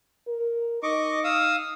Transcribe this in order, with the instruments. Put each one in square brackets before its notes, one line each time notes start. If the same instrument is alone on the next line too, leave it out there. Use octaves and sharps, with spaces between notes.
[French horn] A#4
[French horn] D#4 [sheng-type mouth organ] D#5 C#6 D6
[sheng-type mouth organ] F5 D#6 E6